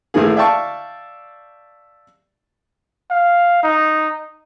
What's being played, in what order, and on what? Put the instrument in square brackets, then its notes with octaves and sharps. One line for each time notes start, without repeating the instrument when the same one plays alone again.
[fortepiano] A1 A2 D#3 E3 A#3 G#4
D5 E5 F5 G5 A5 C#6
[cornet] F5
D#4